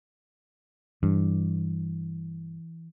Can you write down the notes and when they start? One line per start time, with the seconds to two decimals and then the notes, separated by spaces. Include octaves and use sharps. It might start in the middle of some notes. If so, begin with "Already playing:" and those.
1.03 G2 E3